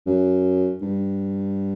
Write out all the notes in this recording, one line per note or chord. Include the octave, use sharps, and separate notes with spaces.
F#2
G2